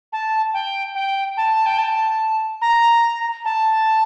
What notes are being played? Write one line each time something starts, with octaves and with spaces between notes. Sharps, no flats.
A5
G5
G5
A5
G5
A5
A#5
A5